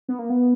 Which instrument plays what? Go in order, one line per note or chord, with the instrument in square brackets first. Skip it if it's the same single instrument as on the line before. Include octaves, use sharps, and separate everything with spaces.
[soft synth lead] B3
A#3
B3